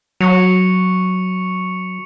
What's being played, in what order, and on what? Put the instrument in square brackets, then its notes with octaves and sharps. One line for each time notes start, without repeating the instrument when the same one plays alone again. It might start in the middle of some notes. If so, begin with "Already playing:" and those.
[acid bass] F#3 [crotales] C#6 C#7 F7